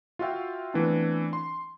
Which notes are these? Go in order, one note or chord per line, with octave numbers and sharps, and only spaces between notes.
F4 F#4 E5 F5 G5
E3 A3 B3 C4 D4
C6